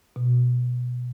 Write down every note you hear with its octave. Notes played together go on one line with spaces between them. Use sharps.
B2